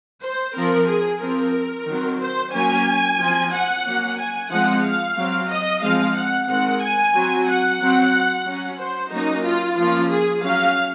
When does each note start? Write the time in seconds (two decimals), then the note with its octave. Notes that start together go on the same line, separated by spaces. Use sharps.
0.22 C5
0.55 F3 C4 A#4
0.88 G#4
1.21 F3 C4 A#4
1.87 D#3 F#3 C4
2.20 C5
2.53 F#3 A#3 C#4 G#5
3.19 F3 C4
3.52 F#5
3.84 F#3 A#3 C#4
4.18 G#5
4.50 F3 G#3 C4 F#5
4.83 F5
5.16 F#3 C4
5.49 D#5
5.82 F3 G#3 C4 F5
6.16 F#5
6.48 D#3 G#3 C4 F#5
6.81 G#5
7.14 F#3 C4
7.47 F#5
7.80 F#3 C4
8.46 F#3 C#4
8.79 C5
9.11 F#3 A#3 C#4 D#4
9.44 F4
9.77 F3 A#3 C#4 F4
10.10 G#4
10.43 F#3 C#4 F5